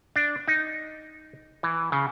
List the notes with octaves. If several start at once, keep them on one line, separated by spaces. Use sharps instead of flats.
D4
D#4
E3
C#3